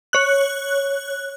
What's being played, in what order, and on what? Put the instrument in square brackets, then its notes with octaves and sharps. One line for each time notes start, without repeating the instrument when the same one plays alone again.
[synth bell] C#5 F#6